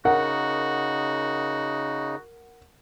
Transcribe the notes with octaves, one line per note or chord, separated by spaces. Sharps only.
C#3 D#4 F#4 A#4 F#5